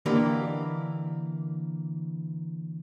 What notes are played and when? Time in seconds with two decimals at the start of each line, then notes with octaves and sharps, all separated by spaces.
0.06 D3 E3 A#3 G4 D#5